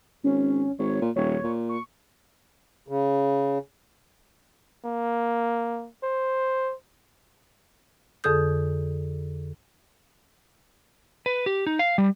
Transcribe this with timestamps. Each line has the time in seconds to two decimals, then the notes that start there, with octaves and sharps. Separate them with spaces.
0.24 G#1 C#4
0.79 G#1 C#5
1.01 A#2
1.16 D#1 C#5
1.43 A#2
1.69 C#6
2.88 C#3
4.85 A#3
6.03 C5
8.24 F2 D3 G#4 A4 D#6 G6
11.26 B4
11.46 G4
11.67 D#4
11.79 F5
11.98 G3